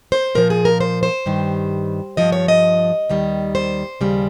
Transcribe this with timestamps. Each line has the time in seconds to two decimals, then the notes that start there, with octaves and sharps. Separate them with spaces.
0.12 C5
0.35 A#2 F3 A#4
0.50 G#4
0.65 A#4
0.80 C5
1.03 C5
1.26 G2 D#3 G3
2.17 G2 F3 D#5
2.32 C#5
2.48 D#5
3.09 D#2 D#3 G3
3.55 C5
4.01 D#2 C#3 G3